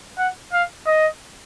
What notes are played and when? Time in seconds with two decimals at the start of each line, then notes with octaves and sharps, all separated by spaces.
0.18 F#5
0.53 F5
0.86 D#5